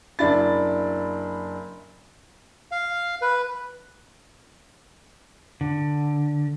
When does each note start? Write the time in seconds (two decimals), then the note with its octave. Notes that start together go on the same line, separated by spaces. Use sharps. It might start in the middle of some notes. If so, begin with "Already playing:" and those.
0.19 F#1 D4 E4 A6
2.72 F5
3.22 B4
5.61 D3